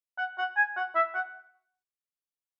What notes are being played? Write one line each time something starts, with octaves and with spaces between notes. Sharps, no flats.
F#5
F#5
G#5
F#5
E5
F#5